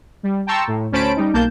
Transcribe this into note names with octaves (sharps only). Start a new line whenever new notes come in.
G3
G5 A5 A#5 C6 C#6 E6
A2
D2 C#4 C5 A5 B5 D7
G3 D#4
B1 A#3 A5 G6